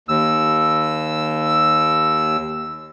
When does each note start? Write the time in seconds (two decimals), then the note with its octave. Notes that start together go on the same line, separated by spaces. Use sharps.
0.09 D#2 E6